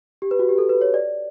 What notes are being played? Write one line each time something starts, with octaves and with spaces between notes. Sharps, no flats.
G4
B4
F#4
G4
A4
B4
C#5
D5